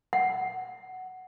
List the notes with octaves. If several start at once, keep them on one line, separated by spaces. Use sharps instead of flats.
F#5